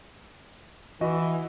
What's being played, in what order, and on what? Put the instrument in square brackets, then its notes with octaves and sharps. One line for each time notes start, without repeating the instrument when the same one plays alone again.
[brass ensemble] E3 [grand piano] F#4 B4 D#5